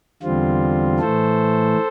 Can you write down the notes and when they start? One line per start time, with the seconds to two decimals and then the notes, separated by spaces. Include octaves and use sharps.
0.22 E2 D3 G3 C4 F4
1.00 A2 E3 A3 A4 C5